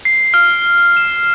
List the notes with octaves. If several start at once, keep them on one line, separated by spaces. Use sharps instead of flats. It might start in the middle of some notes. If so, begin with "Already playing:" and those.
C7
F6
E7